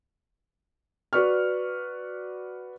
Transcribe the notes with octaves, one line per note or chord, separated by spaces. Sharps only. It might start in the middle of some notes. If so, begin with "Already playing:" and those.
F#4 B4 D5 C#6 F6